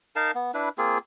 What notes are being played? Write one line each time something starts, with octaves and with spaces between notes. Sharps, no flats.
D#4 A#4 F5 A5
B3
D4 E4 B4
A#3 C4 F4 G#4